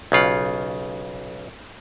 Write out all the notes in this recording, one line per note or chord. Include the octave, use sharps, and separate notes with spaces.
B1 C#3 F4 F#5